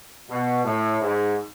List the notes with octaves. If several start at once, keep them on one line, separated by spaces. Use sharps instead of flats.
B2
A2
G#2